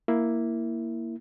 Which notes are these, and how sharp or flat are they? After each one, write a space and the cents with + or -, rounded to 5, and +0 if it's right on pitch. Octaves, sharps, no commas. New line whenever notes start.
A#3 +0 E4 +0